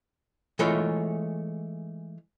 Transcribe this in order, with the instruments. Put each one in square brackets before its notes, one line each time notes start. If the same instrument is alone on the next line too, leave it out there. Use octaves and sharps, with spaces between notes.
[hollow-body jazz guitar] E3 G#3 A3 F4 A#4 C#5